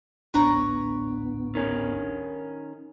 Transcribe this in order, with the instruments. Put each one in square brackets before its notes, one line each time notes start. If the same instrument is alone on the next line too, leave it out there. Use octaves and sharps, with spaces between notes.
[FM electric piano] A1 D4 [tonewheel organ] D2 A2 B3 [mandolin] B4 C#5 A#5
[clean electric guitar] D#3 C#4